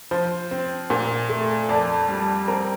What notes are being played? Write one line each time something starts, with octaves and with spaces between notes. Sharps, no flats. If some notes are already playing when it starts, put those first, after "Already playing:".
F3 C5
C4
A#2
A3
F2 D5
G3
C4 A#4